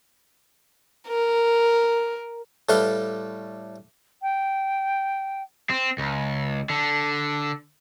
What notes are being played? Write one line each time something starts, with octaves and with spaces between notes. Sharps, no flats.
A#4
A2 G3 A4 B4 F5 C6
G5
C4
C#2
D3